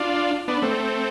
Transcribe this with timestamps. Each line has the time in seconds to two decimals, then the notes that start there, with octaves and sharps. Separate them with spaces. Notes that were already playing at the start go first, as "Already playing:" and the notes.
Already playing: D4 F4
0.48 B3 D4
0.62 A3 C4